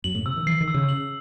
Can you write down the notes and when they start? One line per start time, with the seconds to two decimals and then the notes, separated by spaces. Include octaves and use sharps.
0.04 F#2 F#7
0.15 A2
0.25 C3 E6
0.36 D#3
0.47 E3 C7
0.61 D#3
0.68 E6
0.74 C#3
0.89 F#7